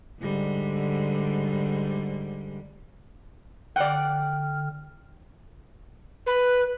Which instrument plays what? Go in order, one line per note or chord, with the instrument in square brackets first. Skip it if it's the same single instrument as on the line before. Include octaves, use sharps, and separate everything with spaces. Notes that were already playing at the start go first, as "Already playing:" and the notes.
[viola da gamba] G#2 D3 G3
[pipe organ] D3 F6 [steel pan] D5 F#5 [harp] G5
[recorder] B4